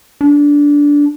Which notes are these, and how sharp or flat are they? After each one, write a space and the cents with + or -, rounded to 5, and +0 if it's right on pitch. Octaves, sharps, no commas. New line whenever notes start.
D4 -15